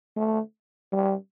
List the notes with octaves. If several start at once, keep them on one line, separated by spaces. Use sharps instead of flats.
A3
G3